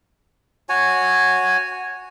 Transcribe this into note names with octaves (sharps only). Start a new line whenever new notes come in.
F#4 C#5 G#5